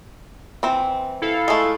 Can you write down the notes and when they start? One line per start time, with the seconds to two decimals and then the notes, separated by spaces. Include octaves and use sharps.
0.63 E3 C4
1.22 E4 A4 F5
1.48 G#3 A3